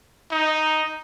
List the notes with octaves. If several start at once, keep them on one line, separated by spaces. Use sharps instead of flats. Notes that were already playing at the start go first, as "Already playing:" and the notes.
D#4